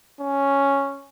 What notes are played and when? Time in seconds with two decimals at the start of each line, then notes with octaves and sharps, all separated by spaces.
0.21 C#4